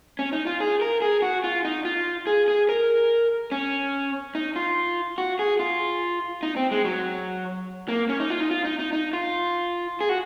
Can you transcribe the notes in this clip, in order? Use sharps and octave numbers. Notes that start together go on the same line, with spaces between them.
C#4
D#4
F4
G#4
A#4
G#4
F#4
F4
D#4
F4
G#4
G#4
A#4
C#4
D#4
F4
F#4
G#4
F4
D#4
C4
G#3
F#3
A#3
C#4
D#4
F4
D#4
F4
D#4
D#4
D#4
F4
G#4
F#4